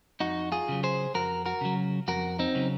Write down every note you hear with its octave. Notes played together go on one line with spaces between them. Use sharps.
F2 D#4 F#4
F4 G#4
C#3 F#3
G#4 C5
F2 F#4 A#4
F#4 A#4
C#3 F#3
F2 F#4 A#4
C4 D#4
C#3 F#3